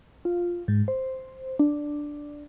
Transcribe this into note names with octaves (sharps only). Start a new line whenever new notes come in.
F4
G#2
C5
D4